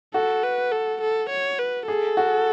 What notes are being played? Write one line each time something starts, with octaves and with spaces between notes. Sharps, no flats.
F#4 A4
B4
A4
A4
C#5
B4
G#4 A4
F#4